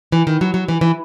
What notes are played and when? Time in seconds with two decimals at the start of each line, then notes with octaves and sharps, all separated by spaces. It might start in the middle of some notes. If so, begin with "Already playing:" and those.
0.12 E3
0.27 D#3
0.41 F#3
0.54 F#3
0.68 E3
0.81 E3